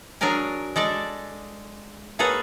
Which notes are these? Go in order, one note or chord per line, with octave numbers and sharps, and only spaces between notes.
F#3 D4 G#4 A#4 G#5
G#3 A4 D5
A#3 G#4 A4 B4 C#5 F#5